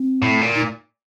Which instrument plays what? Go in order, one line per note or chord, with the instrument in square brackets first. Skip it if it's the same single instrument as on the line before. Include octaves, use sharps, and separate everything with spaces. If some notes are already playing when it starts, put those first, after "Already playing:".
Already playing: [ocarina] C4
[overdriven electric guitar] A2
A#2
[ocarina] D#4